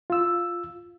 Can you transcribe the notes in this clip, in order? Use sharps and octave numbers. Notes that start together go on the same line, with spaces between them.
F4 E6